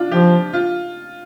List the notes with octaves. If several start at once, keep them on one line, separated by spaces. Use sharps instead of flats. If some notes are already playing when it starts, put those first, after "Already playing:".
Already playing: D4 F4
F3 G4
F4